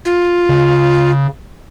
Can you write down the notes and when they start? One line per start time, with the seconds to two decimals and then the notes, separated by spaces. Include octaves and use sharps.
0.05 F4
0.49 C#3